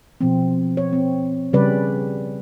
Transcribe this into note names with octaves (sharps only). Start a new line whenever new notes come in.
B2 F3 C4
C#5
C4
C#3 G3 C#4 B4 D5